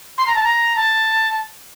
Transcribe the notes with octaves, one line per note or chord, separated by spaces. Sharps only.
C6
A#5
A5
A#5
A5